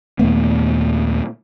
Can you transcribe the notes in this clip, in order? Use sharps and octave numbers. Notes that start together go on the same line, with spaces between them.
D#2 A#2 A3 B3